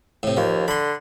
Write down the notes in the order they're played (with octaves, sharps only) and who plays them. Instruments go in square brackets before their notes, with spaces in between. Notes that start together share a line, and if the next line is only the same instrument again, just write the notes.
[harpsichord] A2 C3
[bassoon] D#2 [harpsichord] F3
[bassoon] D3 [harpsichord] B5 C6